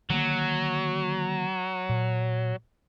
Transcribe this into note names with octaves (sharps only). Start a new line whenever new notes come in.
D3 D#3 F#3 A#3
A#2